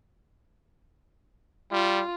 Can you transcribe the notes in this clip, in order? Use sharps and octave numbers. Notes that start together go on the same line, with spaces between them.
G3 F4